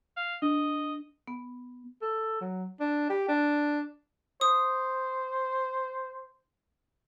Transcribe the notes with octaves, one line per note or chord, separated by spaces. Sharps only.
F5
D4 D#5
B3
A4
F#3
D4
G4
D4
C5 D#6